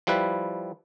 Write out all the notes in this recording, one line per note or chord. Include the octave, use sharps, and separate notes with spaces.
F3 G3 E4 B4